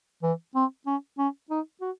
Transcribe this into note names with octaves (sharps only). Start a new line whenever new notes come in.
E3
C4
C#4
C#4
D#4
F#4